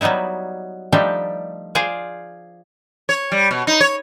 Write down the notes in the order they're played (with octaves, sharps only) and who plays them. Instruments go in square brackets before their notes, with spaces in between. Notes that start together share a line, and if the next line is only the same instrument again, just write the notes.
[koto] F#3 G3 B3 D#4 E4
F3 G3 A3 D4 D#4 G4
F4 G#4 C5 D5 F5
[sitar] C#5
G3
B2
D#4
C#5